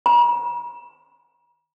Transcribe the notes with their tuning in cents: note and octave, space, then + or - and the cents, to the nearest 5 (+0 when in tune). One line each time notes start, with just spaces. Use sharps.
A#5 +45